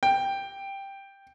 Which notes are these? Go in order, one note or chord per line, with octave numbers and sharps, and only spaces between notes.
G5